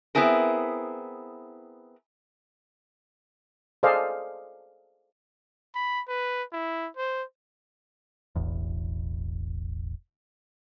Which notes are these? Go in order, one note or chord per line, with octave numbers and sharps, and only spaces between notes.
B3 C4 E4 G#4 A#4
G#4 A4 C5 D5 D#5 F5
B5
B4
E4
C5
E1 A1 E2